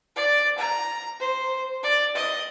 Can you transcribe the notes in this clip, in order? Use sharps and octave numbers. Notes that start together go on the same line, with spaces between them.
D5
A#5
C5
D5
D#5